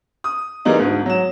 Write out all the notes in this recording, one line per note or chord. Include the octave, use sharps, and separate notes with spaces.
D#6
E3 G3 G#3 A#3 D#4
D2 G#2
F#3 E7